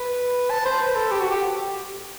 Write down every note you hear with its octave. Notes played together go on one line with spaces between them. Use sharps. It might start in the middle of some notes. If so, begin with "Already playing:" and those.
Already playing: B4
A5
C5
B4
A4
G4
F#4
G4